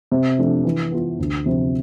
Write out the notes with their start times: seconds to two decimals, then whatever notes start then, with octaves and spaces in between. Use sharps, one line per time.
0.12 C3
0.39 F3 A3 D4
0.65 E3
0.92 B3 F4
1.19 D2
1.46 C3 F3 C4